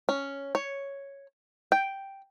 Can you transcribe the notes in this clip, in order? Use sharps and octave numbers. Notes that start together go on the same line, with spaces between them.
C#4
C#5
G5